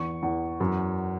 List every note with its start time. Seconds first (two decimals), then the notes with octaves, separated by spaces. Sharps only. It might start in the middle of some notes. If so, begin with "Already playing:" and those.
Already playing: E2 E3 C#6
0.23 E2
0.60 F#2